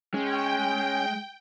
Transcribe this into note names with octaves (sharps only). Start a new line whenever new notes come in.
G#3 C#4 G5